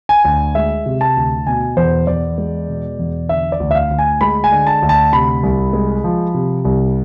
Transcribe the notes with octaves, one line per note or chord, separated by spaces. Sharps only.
G#5
D2
G#3 E5
C3
A5
D2
B2 G#5
E2 C5
E2 D5
G#3
B2
E2
D3 E5
D5
D2
E5
F5
D2
G#5
G#3 B5
G#5
D3
A5
D2
A5
C3 B5
C2
G#3
F3
C3
C2